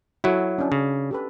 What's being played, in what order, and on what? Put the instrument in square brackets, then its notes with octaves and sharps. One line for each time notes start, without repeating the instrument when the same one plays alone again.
[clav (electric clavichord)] F#3 E4 [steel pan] F#4 A4
[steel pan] C#4 D4
[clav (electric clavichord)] C#3
[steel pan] G4 A4 B4